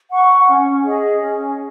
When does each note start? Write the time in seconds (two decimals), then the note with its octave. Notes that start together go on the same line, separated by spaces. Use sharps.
0.10 F#5 C#6
0.47 C#4
0.84 G#4 D#5
1.20 C#4